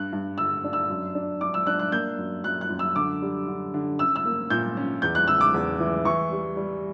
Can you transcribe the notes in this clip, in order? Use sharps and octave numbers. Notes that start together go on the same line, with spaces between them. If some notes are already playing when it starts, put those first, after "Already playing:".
Already playing: G2 F#6
G2
D3 E6
D4
E6
F#2
D4
D4 D6
E6
D4 F#6
F#6
A#3 G6
F#2
F#2 F#6
F#6
F#2
E6
D3 D6
G3
D3
D3
C#4 E6
E6
A#3
A#2 G6
C#4
E2 G6
F#6
C#3 E6
D6
E2
E3
E3 C#6
G3
G3